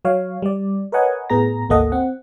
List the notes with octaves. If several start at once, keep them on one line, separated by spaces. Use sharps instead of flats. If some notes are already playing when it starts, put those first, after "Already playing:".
F#3 C#5 F5
G3 D5
A#4 B4 C#5 D#5 F#5 G#5
A2 B3 G#4 A#5 A#6
G#1 D2 A#3 A4 D#5 F#5
C4 F#5